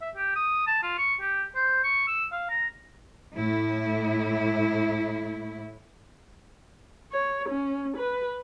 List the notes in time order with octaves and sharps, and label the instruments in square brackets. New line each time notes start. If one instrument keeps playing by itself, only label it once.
[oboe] E5
G4
D#6
A5
F4
C#6
G4
C5
C#6
E6
F5
A#5
[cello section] A2 E4
[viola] C#5
C#4
B4